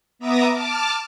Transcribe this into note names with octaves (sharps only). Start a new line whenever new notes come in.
B3 E5 A#5 D6 D#6 A#6
A5 D6 F6